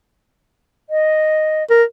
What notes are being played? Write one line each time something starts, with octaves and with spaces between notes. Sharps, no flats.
D#5
A#4